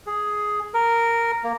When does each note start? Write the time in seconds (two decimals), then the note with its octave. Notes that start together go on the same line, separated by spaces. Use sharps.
0.07 G#4
0.74 A#4
1.44 A#3